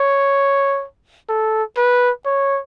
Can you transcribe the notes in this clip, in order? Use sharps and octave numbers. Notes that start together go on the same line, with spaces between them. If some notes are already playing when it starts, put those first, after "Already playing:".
Already playing: C#5
A4
B4
C#5